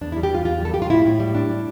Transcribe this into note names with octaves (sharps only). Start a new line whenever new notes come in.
E2 D4
G3 E4
G4
E2 F4
E2 F4
G3 A4
G3 G4
F4
A2 E4
A2
G3
D4
G3